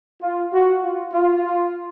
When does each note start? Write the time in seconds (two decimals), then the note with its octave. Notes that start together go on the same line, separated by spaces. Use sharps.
0.22 F4
0.53 F#4
0.83 F4
1.13 F4